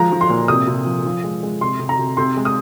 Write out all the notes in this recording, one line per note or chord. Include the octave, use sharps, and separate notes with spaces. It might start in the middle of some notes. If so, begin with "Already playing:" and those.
Already playing: F3 G#3 A#5
F3
C6
A#2
C3 D#6
C3
F3
F3
G#3
G#3
C3 C6
C3
A#5
C3
C3 C6
G#3
D#6